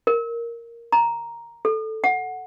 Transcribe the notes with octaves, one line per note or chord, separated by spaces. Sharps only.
A#4
A#5
A4
F#5